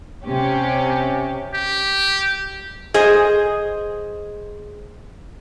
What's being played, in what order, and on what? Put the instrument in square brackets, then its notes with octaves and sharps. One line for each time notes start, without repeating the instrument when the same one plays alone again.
[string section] C3 C#4 G4
[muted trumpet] G4
[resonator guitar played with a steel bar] G#4 C5 D#5